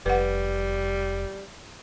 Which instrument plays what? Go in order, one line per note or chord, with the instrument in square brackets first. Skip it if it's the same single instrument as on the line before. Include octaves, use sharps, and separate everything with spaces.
[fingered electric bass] F1 [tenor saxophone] G3 [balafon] B4 F#5